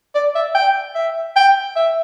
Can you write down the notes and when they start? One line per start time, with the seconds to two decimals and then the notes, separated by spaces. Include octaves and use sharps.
0.15 D5
0.35 E5
0.55 G5
0.95 E5
1.36 G5
1.76 E5